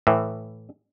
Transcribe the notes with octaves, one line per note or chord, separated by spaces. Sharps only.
A2 E3